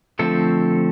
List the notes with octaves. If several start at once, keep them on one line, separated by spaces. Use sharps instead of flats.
D3 F3 A3 C4 A4